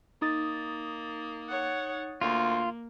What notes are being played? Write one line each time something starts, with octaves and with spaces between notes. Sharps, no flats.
A#3 D#4 D#6 A6
C#5 F#5
D2 A#3 F4